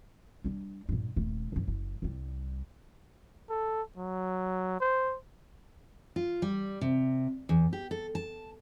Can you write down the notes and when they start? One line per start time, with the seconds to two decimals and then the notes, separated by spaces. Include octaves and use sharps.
0.44 G3 D4
0.89 G2 A#2
1.16 D#1 A3
1.52 F#1 F#2
1.68 F#1
2.02 C2 G3
3.50 A4
3.97 F#3
4.80 C5
6.16 F4
6.42 G3
6.81 C3
7.49 E2
7.73 G4
7.91 A4
8.15 A5